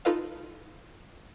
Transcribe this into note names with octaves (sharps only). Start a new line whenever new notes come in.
D#4 F4 A4 B4 D#5 F5